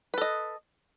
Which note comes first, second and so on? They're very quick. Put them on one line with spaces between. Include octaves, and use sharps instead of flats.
B4 A4 D#5